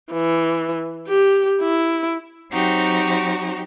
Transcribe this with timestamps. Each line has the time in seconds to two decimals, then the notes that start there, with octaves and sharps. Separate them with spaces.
0.12 E3
1.09 G4
1.62 E4
2.51 F#3 C4 D#4 F#4 G4